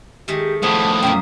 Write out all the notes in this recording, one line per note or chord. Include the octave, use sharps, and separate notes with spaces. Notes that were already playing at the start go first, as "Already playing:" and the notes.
D#3 G#3 A3 G4
A2 F3 F#4 B4 A5 D#6
F#2 B2 A#3 G5